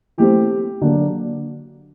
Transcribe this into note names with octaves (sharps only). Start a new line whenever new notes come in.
E3 A3 C4 G4
D3 F#3 A#3 D4